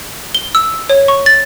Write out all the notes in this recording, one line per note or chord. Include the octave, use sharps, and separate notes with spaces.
G7
E6
C#5
C#6
A6